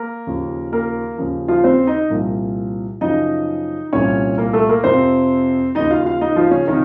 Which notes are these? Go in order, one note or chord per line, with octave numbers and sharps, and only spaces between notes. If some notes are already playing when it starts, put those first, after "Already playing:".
Already playing: A#3 A#4
D#2 C#3 F3
A#3 A#4
D#2 C#3 F3
F3 F4
C4 C5
D#4 D#5
C2 A#2 F3
F#2 C#3 F3 D#4 D#5
C2 A#2 F3 C#4 C#5
A#3 A#4
A3 A4
A#3 A#4
F2 C3 F3 C4 C5
D#2 C#3 F3 D#4 D#5
F4 F5
F4 F5
D#4 D#5
F3 F4
C#3 C#4
C3 D#3 F3 D#4